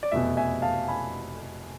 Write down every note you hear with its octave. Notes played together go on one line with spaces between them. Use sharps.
D5
F1 E2 B2 E5
E5 G#5
F5 A5
G#5 B5